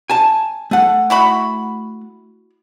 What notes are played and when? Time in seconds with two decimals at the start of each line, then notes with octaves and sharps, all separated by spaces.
0.10 G#5 A5
0.71 A3 F#5
1.10 E4 F#4 B5